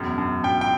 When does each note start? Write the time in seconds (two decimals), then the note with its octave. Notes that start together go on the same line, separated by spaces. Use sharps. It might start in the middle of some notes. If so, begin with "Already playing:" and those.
Already playing: E1 F#2
0.18 F#2
0.43 F#2 G5
0.61 G5